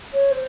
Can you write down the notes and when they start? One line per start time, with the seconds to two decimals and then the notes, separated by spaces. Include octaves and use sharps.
0.14 C#5
0.31 C5